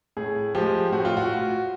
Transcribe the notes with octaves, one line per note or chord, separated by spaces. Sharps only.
A2 G#4
F3 G#3 G4
A2 F#4
F4
F#4